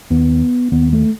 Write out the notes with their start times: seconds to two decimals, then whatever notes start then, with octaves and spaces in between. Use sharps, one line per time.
0.10 D#2 B3
0.72 D#2 B3
0.93 A3